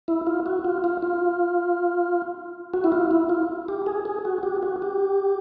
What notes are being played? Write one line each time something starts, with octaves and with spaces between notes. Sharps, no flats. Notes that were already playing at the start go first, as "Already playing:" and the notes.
E4
F4
F#4
F4
F4
F4
F#4
E4
F4
E4
F4
G4
G#4
G#4
F#4
G4
F#4
G4